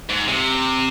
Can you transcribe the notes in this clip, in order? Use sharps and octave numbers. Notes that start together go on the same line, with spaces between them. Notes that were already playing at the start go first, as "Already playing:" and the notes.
G#2
C3